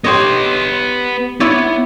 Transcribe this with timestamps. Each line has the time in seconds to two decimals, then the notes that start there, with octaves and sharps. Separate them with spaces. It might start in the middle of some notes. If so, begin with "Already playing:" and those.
0.04 B3 G4 C#5 D#5 C6
1.40 B3 E4 C#5 D5